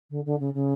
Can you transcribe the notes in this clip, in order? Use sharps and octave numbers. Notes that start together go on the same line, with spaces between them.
D3
D3
C#3
C#3